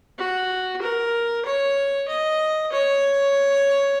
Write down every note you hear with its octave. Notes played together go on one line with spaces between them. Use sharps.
F#4
A#4
C#5
D#5
C#5